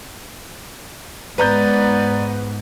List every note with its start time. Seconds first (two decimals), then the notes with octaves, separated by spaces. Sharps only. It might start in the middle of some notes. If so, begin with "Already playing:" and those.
1.38 G#2 B3 B4 D5 A#5 G6